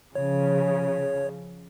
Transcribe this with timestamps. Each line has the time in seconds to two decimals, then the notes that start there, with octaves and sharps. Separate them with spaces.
0.15 C#3 F3 C#5